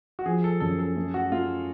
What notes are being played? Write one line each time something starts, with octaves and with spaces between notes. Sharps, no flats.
F#4
F3 G#4
A4
F#2 A4
A4
A3
F#4
A3 F4